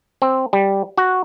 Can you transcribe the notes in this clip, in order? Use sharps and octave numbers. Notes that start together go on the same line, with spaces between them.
C4
G3
F#4